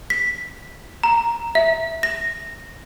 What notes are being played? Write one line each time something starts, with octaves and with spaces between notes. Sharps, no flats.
B6
A#5
E5
A#6